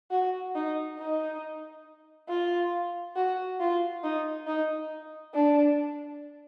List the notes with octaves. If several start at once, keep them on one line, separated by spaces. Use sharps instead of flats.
F#4
D#4
D#4
F4
F#4
F4
D#4
D#4
D4